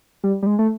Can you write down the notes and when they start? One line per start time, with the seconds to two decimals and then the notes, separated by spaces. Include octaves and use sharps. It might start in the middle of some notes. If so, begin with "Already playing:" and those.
0.24 G3
0.42 G3
0.46 G#3
0.59 A3